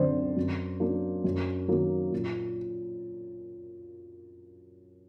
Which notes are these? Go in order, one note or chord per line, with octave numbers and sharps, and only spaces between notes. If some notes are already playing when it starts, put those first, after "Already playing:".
Already playing: F#2 D3 F#3 C4 C5 D5
F#2
F#3 A#3 D4
F#2
D#3 F#3 A#3
A#2